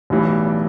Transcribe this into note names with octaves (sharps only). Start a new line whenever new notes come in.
B1 A2 E3 G3
D5